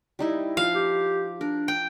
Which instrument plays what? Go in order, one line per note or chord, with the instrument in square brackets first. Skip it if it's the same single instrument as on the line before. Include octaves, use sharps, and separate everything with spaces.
[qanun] G3 D#4 E4
[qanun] F3 [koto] F5
[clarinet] G4
[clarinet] D4 [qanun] A#4
[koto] G5